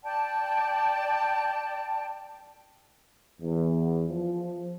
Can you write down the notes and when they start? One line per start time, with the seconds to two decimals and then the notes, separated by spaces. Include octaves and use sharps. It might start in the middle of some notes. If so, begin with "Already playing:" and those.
0.03 D5 G5 A5
3.41 E2
4.09 F3